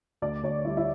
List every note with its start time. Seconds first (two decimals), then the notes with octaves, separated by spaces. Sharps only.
0.22 D2 D5
0.43 D2 C#5
0.65 G3 E4
0.77 E4